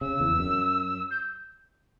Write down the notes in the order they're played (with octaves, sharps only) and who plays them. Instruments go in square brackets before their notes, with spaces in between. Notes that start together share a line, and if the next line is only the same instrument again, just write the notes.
[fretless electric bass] C#3 [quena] E6
[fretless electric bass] E2
F#2
[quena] G6